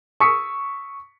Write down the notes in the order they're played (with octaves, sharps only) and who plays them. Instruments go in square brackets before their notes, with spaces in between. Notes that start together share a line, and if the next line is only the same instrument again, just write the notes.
[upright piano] C#6 D#6 E6 B6 C#7